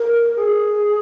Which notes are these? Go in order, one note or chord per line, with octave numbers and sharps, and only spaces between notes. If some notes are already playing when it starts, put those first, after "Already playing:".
Already playing: A#4
G#4